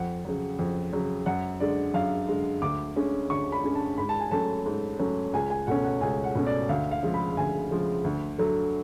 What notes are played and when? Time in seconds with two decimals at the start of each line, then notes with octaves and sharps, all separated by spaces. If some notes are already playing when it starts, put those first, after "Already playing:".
Already playing: F2 F#5
0.25 C#3 F#3
0.59 F2
0.93 C#3 F#3
1.26 F#2 F#5
1.60 D3 G#3 D5
1.94 F#2 F5
2.28 D3 G#3
2.62 D2 D6
2.96 D3 G#3 C#4
3.30 D2 C#6
3.52 B5
3.64 D3 G#3 C#4
3.75 A5
3.98 G#2 B5
4.09 A5
4.20 G#5
4.31 F#3 A3 C#4 A5
4.66 G#2
4.99 F#3 A3 C#4
5.34 C#2 G#5
5.50 G#5
5.67 B2 A3 C#4 F#5
5.84 F#5
6.01 C#2 G#5
6.24 F#5
6.35 B2 A3 C#4
6.46 D5
6.69 D2 F5
6.91 F5
7.03 C#3 F3 G#3
7.14 B5
7.37 D2 G#5
7.71 C#3 F3 G#3
8.04 D2
8.38 D3 F#3 A3